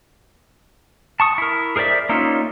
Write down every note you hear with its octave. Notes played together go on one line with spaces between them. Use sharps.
A5 C#6 D#6
E4 A#4
G#4 A#4 C5 D5 E5
A#3 C#4 D#4 F4 E5